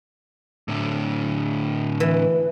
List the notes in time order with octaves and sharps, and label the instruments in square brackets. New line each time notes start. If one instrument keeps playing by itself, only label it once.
[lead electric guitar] A2 D3
[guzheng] E3